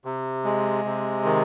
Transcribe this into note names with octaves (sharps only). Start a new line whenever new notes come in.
C3
G#3
C3
D#3